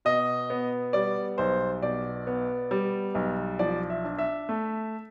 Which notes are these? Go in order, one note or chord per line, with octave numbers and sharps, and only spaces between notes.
B2 D#5
B3
G3 D5
B1 C5
B2 D5
B3
G3
B1
F3 D5
E5
D4
E5
A3